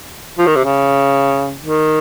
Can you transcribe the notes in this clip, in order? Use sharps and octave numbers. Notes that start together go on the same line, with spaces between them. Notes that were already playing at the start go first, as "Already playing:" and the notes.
F3
D#3
C3
C#3
D#3